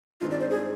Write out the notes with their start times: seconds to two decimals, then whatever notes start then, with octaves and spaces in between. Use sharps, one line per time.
0.21 G2 D#3 G#3 C4 F4
0.31 D5
0.40 C5
0.50 G#4